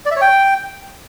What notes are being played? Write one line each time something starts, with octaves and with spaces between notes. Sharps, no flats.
D5
E5
C#5
G5